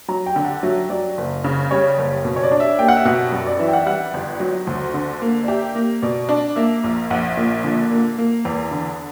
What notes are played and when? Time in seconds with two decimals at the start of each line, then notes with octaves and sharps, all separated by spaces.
0.08 F#3 A#5
0.26 G5
0.36 D3
0.45 F#5
0.63 F#3 E5
0.90 F#3 D5
1.17 F#1
1.44 C#3
1.71 G3 C#5
1.98 F#1
2.25 B2
2.36 C#5
2.43 D5
2.51 D4
2.60 E5
2.79 A#3 G5
2.88 F#5
2.97 E5
3.05 B2 F#5
3.32 F#2
3.46 D5
3.59 E3 E5
3.68 G5
3.73 F#5
3.81 E5
3.86 G3 F#5
4.14 G1
4.40 F#3
4.67 D2
4.94 D3
5.21 A#3
5.43 D5
5.48 G4 E5
5.75 A#3
6.02 B2 D5
6.29 D4
6.56 A#3 E5
6.84 A#1
7.10 A#1 F#5
7.37 A#2
7.64 D3
7.91 A#3
8.18 A#3
8.45 E2
8.71 D3